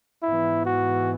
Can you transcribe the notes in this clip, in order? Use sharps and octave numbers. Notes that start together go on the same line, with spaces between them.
G#2 E3 B3 E4
F#4